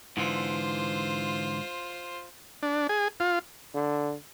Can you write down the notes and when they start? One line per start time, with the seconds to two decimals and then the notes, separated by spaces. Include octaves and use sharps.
0.17 G#2 D3 E3 F4 C5
2.63 D4
2.89 G#4
3.20 F4
3.74 D3